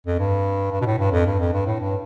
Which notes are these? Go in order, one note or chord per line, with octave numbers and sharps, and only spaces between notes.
F2
G2
G2
B2
A2
G2
F2
G2
F2
G2
A2
G2